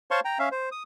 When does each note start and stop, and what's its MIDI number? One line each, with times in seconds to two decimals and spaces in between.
0.11 0.20 72
0.11 0.20 73
0.11 0.20 77
0.11 0.20 81
0.11 0.20 84
0.11 0.20 85
0.25 0.38 79
0.25 0.38 82
0.39 0.49 61
0.39 0.49 76
0.39 0.49 77
0.51 0.69 72
0.72 0.83 87